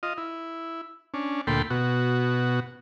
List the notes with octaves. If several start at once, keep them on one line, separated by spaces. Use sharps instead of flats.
F4 D#5
E4
C#4 D4
D2 A#2 A4 G5 B5 C6
B2 F#4